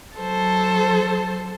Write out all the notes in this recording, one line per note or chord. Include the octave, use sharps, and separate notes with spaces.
F#3 A4 C5 A5